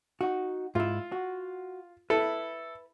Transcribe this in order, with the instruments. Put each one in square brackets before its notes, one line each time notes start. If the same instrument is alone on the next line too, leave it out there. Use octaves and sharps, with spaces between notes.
[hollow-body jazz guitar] D#4 F#4
[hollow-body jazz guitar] G#2 E4 [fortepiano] F4
[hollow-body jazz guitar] F#4
[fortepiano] E4 A4 [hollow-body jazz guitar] B4